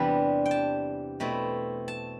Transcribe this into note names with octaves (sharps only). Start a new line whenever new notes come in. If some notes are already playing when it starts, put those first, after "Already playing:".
Already playing: E2 C3 G3 B3 D4 B5
G5
A5
B2 A3 C4 E4
A5